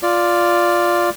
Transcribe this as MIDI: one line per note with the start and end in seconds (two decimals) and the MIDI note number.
0.03 1.10 65
0.03 1.10 74